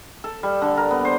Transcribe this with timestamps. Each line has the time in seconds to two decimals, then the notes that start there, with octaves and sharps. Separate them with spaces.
0.24 A4
0.43 G3
0.62 D3
0.77 A#4
0.91 B3
1.05 C5